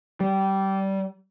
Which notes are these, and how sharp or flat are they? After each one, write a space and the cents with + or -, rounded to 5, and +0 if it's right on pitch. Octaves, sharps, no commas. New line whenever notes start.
G3 -20